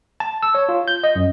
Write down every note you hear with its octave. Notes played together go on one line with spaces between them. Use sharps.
A5
E6
C#5
F4
G6
D#5
F#2